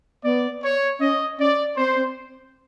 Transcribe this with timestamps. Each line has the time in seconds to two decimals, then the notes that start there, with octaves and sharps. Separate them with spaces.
0.24 B3 D5
0.62 C#5
0.99 C#4 D#5
1.38 C#4 D5
1.75 C4 C5
1.95 C4